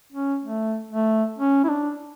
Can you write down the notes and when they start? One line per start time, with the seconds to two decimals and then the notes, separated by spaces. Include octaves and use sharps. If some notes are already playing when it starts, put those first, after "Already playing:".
0.12 C#4
0.43 A3
0.91 A3
1.38 C#4
1.64 E4
1.69 D4